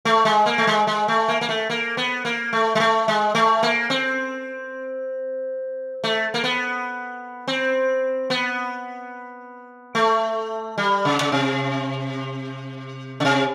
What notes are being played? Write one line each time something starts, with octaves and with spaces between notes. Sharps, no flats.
A3
G#3
A#3
A3
G#3
G#3
A3
A#3
A#3
A3
A#3
B3
A#3
A3
G#3
A3
G#3
A3
A#3
C4
A3
A#3
B3
C4
B3
A3
G3
C#3
C#3
C3
C#3
C3